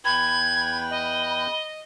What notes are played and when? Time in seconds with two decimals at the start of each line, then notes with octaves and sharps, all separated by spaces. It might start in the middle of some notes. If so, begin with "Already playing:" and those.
0.05 E2 B4 G5 B5 G#6
0.90 D#5